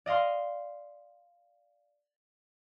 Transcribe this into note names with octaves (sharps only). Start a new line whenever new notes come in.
D5 D#5 F5 C6